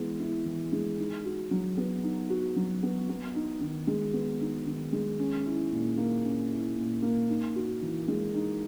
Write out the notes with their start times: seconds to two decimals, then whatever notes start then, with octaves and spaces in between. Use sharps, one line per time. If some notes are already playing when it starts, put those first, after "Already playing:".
Already playing: E3 G#3 B3 E4
0.20 E4
0.45 E3
0.72 G#3
0.99 D#4
1.25 F#4
1.51 F#3
1.77 B3
2.03 D#4
2.30 F#4
2.56 F#3
2.83 B3
3.09 B3
3.35 D#4
3.61 D#3
3.87 G#3
4.13 B3
4.40 D#4
4.66 D#3
4.92 G#3
5.19 C#4
5.46 E4
5.72 A#2
5.97 A#3
6.24 C#4
6.51 E4
6.77 A#2
7.02 A#3
7.29 D#4
7.55 F#4
7.82 E3
8.08 G#3
8.34 D#4